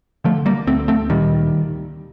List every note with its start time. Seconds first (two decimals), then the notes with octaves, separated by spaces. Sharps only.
0.24 D3 F3 A3
0.46 G3 A#3
0.67 D2 A3 C4
0.88 A3 C4
1.10 A#2 D#3 G3